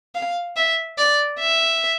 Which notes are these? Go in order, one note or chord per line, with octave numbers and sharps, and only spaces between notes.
F5
E5
D5
E5